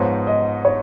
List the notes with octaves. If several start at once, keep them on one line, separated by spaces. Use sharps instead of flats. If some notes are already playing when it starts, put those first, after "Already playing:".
Already playing: G#2 F3 B3 D#4 C#5
D#5
C#5